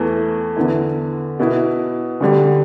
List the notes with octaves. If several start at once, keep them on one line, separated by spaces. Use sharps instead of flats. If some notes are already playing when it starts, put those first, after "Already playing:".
Already playing: E2 E3 A3
E2 D3 B3 E4
B2 B3 E4
D2 D3 G3